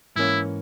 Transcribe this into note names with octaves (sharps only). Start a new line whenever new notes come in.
G#2 E3 A#3 C#4 E4